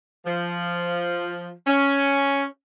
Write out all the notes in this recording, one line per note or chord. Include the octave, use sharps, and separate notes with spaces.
F3
C#4